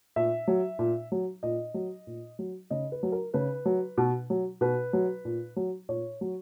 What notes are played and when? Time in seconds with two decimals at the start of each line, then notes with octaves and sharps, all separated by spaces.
0.16 A#2 E5
0.48 F#3
0.79 A#2
1.12 F#3
1.43 A#2 D#5
1.74 F#3
2.07 A#2
2.39 F#3
2.70 C#3 D#5
2.92 B4
3.03 F#3
3.12 A#4
3.34 C#3 B4
3.66 F#3
3.98 B2
4.30 F#3
4.61 B2 B4
4.93 F#3
5.25 A#2
5.56 F#3
5.89 A#2 C#5
6.21 F#3